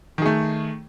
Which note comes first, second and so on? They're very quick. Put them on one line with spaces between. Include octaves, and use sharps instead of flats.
D#3 G#4 A3